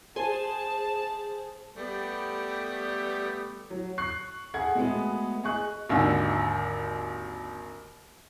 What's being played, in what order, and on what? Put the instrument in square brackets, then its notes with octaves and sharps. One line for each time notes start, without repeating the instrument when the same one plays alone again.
[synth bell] G#4 C5 [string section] A5
[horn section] G3 A3 B3 G4
[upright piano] F#3
C#6 F#6 C7
G#4 A4 F#5 G#6
B2 G#3 A3 B3
G#4 D#5 C#6 F#6
[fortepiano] G#1 D#2 D3 E6